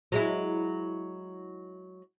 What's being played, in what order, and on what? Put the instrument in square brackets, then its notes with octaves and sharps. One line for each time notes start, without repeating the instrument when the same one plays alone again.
[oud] F#3 G#3 E4